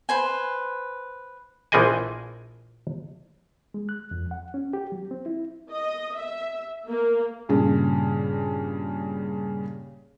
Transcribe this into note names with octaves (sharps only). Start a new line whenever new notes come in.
B4 C5 G#5
A#1 E3 F3 G#4 D#5 G#5
G#3
F#6
F2
F#5
C#4
G4
F#3
C4
E4
D#5
E5
A#3
G2 A#2 C#3